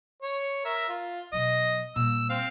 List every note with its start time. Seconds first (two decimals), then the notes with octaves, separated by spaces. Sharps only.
0.23 C#5
0.65 A#4 E5
0.89 F4
1.33 B2 F#3 D#5
1.96 A#2 G3 E6
2.30 C4 F5